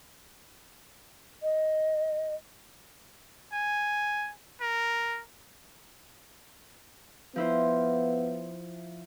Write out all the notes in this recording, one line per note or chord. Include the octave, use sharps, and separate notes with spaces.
D#5
G#5
A#4
F3 B3 E4 C5